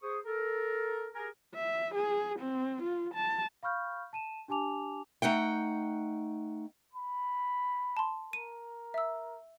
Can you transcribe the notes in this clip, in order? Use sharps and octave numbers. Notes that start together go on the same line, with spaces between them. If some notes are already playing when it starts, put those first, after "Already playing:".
G#4 C5 C#6 D#6
A4 A#4
G4 G#4 A#4 G#5
E5
G#4
C4
F4
A5
F5 B5 C#6 F6 G6
A5 D#7 E7
D4 G4 G#5 A5 D6 F7
A3 D#4 F#5 G5
B5
A5 C6
A#4 D#7
E5 E6